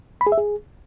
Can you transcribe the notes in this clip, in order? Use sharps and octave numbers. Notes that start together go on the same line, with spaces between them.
B5
G#4
E5
G#4